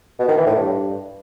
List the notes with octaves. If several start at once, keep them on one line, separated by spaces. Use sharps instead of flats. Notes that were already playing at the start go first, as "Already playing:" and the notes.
B2
D#3
E3
A2
G2